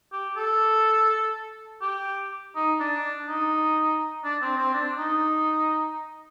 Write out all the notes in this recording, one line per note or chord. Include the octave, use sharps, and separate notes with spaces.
G4
A4
G4
D#4
D4
D#4
D4
C4
C4
D4
D#4